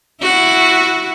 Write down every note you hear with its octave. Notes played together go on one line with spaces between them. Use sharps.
E4 F#4